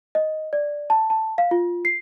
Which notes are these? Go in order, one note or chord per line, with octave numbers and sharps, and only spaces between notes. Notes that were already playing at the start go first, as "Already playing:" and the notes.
D#5
D5
A5
A5
F5
F4
C7